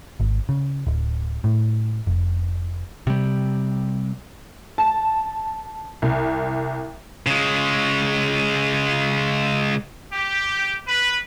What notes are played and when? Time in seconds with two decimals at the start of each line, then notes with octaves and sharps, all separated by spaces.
0.20 G#1
0.49 C#3
0.87 D1
1.44 A2
2.07 F1
3.07 C3 G3
4.78 A5
6.02 C2
7.27 C#3 G#3
10.13 G4
10.87 B4